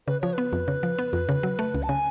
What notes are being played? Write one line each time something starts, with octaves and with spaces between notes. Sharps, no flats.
C#3 B4
F3 C#5
B3 B4
F2
C#3
F3
B3
F2
C#3
F#3
A3
C#2
A5
C#3 G#5